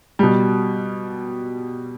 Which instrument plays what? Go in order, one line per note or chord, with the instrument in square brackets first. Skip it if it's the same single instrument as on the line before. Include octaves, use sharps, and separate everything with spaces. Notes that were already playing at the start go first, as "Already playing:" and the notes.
[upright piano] B2 G3